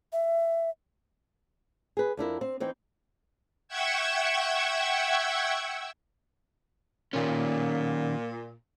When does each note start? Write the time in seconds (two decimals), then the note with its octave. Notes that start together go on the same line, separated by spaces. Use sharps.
0.13 E5
1.97 G#4 B4
2.17 F2 D4 E4 A#4
2.41 C4
2.60 E3 C4 D#4 G5
3.68 E5 F#5 G5 C#6 E6 G#6
7.13 A#2 D#3 C#4